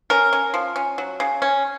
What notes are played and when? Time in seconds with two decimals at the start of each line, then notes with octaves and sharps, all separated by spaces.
0.10 C#4 A#4
0.33 C#4
0.54 F3
0.76 C#4
0.98 F#3
1.20 C#3
1.42 C#4